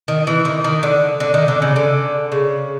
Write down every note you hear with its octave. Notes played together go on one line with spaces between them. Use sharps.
D#3
E3
D#3
D#3
D3
D3
D#3
D3
C#3
D3
C#3